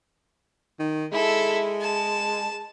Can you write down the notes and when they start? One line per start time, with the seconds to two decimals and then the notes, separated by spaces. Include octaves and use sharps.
0.80 D#3
1.12 G#3 E4 A4
1.81 A5